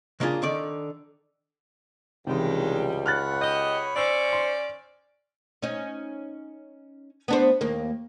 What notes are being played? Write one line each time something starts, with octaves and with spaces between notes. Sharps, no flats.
C#3 A#3 D4 F4 G#4
D3 D#3 D5
C#2 C3 D#3 E3 G3 G#3
C#5 F#5 B5 F6 F#6 A6
G4 D#5 G6
C#4 C5 D5 C#6 E6
C6
C#4 D#4
B3 D4 C5
D#2 A#3